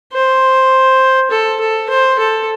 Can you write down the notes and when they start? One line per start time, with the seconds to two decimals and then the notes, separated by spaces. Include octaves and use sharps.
0.13 C5
1.31 A4
1.60 A4
1.89 C5
2.19 A4